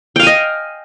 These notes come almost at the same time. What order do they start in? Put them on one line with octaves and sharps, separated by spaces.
G5 F5 G#5 D#5